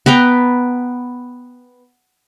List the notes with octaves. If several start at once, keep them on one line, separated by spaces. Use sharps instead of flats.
B3 B4 G5 A#5